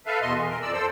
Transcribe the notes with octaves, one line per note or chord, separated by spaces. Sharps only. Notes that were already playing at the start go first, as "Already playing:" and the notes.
A4 B4 E5 F5
E2 B2 D#5 C6
E3
A#4
F2 D5 E6
A4 C5 E6